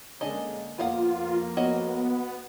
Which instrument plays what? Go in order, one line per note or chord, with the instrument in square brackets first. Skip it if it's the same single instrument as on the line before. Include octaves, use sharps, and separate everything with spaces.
[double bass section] D3 G#3 A#3 [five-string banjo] C#4 D4 D#5
[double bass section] F2 A#3 [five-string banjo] B3 F5 F#5 [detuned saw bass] F4
[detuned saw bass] B3 [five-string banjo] F#4 C#5 D#5